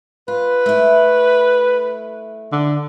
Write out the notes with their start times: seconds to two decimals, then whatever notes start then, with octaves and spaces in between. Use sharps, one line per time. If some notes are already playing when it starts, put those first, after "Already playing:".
0.28 F4 B4
0.66 A3 E4
2.52 D3